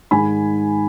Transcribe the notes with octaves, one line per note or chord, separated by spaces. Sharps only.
G#2 D#3 G#5 B5